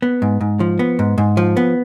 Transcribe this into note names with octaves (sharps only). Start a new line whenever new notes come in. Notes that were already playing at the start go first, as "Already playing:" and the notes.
B3
G#2
G#2
F3
B3
G#2
G#2
F3
B3